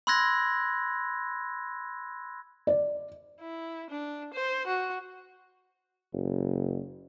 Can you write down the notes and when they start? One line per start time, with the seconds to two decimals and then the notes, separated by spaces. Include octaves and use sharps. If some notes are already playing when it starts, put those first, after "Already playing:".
0.07 B5 C6 E6 F#6 G#6 A#6
2.67 D5
3.41 E4
3.90 D4
4.34 C5
4.67 F#4
6.13 F#1